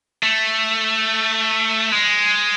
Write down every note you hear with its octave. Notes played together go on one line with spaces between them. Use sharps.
A3
G#3